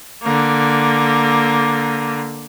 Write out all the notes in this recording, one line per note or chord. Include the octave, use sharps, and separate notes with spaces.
D3 A#3